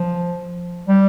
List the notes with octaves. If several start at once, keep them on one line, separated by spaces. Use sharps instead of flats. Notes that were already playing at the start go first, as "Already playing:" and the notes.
Already playing: F3
G3